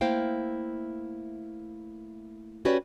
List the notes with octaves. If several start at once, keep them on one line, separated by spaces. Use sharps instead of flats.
A3 A#3 E4 C5 F5 G5
C#4 F#4 G4 B4 C#5 D5